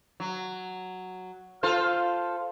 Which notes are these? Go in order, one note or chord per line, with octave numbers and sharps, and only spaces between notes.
F#3
F4 A4 C5